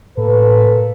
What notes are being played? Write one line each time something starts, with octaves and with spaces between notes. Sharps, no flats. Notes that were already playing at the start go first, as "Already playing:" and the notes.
A2 A#3 A4 B4